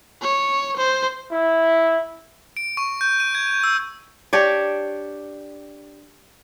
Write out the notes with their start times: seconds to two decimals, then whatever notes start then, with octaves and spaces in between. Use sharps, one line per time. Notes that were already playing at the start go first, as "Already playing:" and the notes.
0.22 C#5
0.77 C5
1.31 E4
2.57 D7
2.77 C#6
3.01 G6
3.20 D#7
3.35 G#6
3.63 E6
4.33 D4 G4 C#5 D5